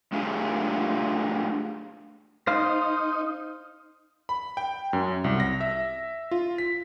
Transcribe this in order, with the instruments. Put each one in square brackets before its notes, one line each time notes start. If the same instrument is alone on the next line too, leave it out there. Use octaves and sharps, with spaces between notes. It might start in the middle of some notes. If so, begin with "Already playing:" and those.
[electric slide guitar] A3 D4 F4 G4 G#4
[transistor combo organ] D#4 [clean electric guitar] C5 F5
[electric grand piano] B5
G5
F#2
C2
A#6
E5
F4
B6